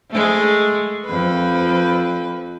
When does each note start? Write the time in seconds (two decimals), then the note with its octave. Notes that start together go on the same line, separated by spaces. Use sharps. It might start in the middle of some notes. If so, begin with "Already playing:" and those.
0.11 G#3 A3
1.05 F2 B4